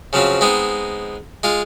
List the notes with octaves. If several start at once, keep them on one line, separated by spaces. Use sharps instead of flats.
C#3 F3 F#3 C4
G#3 B3 C4 D#4
G#3 F4